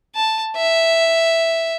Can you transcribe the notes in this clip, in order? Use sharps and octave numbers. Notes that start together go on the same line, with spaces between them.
A5
E5